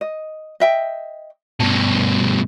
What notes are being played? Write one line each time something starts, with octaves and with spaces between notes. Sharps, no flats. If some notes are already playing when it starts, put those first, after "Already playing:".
D#5
D#5 E5 G5
G2 B2 A5